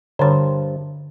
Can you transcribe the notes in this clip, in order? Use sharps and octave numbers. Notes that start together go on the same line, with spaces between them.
G2 D3 C5 C#5